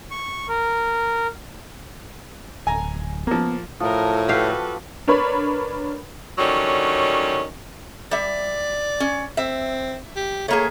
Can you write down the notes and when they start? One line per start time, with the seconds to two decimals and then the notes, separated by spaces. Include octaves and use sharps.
0.11 C#6
0.48 A#4
2.67 D1 G#5 A#5
3.27 F3 A#3 B3
3.80 A2 F3 A4 A#4
4.29 F#4 G4 A4 B4 F5
5.08 D4 A#4 B4 C#5 B5
6.38 D3 D#3 F#3 G3 C#4
8.11 G3 D5 E5
9.00 C#4
9.37 C4 E5
10.16 G4
10.48 A3 A#3 G#4 C#5